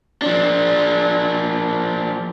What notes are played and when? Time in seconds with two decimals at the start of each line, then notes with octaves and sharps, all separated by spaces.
0.22 F3 D4